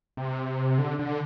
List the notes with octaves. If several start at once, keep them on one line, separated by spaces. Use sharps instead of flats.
C3
D3
D3